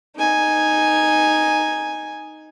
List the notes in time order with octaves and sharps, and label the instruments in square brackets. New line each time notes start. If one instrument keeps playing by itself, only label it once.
[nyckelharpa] D#4 G#5